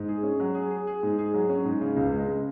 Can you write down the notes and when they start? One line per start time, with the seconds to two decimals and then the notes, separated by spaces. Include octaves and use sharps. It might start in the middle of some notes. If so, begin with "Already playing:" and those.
Already playing: G#2
0.08 G#4
0.23 C#4
0.40 F#3
0.55 G#4
0.70 G#4
0.87 G#4
1.03 G#2
1.19 G#4
1.34 F#3
1.49 C#4
1.65 G#2
1.81 C#3
1.96 C#2
2.12 G#3
2.28 C#3